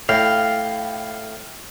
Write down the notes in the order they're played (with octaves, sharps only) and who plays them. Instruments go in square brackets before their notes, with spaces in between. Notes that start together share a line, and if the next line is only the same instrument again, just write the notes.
[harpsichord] A2 [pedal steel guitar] F5 G5